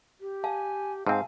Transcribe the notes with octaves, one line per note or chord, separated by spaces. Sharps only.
G4
F5 G#5 A5
G#2 C4 F5 G#5 A5